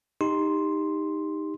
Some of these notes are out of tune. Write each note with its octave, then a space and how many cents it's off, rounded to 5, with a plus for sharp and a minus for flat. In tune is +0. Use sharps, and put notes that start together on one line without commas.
D#4 +0 G4 +20 C6 +0